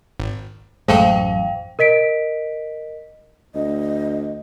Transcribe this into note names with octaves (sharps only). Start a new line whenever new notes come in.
G#1
A1 F#2 G#3 A3 A4 C5 F5 G5
A#4 D#5 B6 D7
D2 D#5